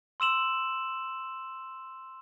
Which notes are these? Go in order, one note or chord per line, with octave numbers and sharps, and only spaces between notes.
C6 E6 E7 F#7